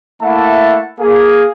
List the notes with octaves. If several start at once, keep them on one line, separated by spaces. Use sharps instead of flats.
A3 A#3 E4 E5 F#5 A5
A#3 G#4